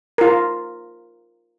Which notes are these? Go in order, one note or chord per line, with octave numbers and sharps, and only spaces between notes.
F4 A#4